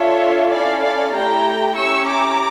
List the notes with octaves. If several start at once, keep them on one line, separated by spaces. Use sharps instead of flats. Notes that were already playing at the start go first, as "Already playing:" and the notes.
Already playing: D4 F4 A4 C#5 E5
C#4 E4 A4 D5 F5
D5 F5
A3 E4 G4 G5 A#5
C#4 E4 G4 C#6 E6
A#5 D6